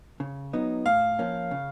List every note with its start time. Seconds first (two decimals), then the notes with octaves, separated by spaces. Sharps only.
0.20 C#3
0.53 F#3 B3 D#4
0.86 A2 F5
1.19 F3 A#3 C#4
1.51 C#3